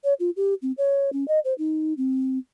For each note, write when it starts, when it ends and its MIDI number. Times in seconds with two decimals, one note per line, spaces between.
0.04 0.14 73
0.20 0.30 65
0.36 0.54 67
0.62 0.72 60
0.78 1.10 73
1.13 1.27 61
1.28 1.39 75
1.45 1.54 72
1.58 1.93 63
1.97 2.38 60